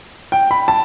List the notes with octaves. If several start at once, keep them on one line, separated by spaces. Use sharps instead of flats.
G5
B5
A5